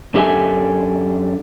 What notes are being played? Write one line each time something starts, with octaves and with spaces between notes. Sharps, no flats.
F#2 D4 G4 A4 E5 G#5